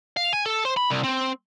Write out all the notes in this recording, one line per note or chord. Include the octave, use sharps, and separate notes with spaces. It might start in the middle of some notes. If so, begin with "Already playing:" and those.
F5
G#5
A4
C5
B5
C2
C4